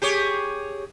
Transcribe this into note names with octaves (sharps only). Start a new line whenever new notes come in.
G4 G#4 C#5